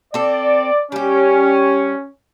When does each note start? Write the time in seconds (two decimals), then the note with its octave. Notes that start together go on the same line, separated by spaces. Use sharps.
0.14 C4 A4 D5
0.92 G3 C#4 G4